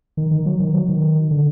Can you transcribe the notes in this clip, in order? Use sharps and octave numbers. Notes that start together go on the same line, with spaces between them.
D#3
D#3
F#3
D#3
F#3
D#3
D3